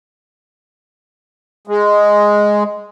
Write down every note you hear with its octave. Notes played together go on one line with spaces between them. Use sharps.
G#3